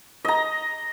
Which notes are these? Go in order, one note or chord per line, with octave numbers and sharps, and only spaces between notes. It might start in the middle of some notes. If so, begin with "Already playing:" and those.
D#5 A#5